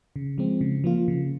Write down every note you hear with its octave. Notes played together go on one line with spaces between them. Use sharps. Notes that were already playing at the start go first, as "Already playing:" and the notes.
C#3
F3 G#3 C4
C#3
F3 A#3 F4
C#3